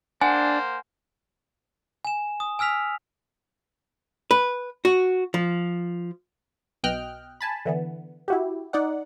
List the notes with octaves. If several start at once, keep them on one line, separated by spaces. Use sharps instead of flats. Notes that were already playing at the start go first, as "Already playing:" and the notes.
A#3 D4 C5 F#5 G#5
G#5 E7
D#6
G#5 E6 F6 B6 F7
B4
F#4
F3
B1 B2 D#5 G5 F6 F#6
G#5 A5 B5
D3 E3 B3
E4 F#4 G4
D#4 D5 F#5